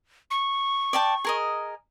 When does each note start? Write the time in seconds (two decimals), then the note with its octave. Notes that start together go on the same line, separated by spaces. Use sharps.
0.31 C#6
0.93 D5 G5 A5
1.24 G#4 A#4 D#5